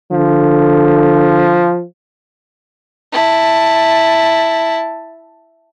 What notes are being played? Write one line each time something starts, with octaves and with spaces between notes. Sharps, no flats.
D3 F3
E4 A5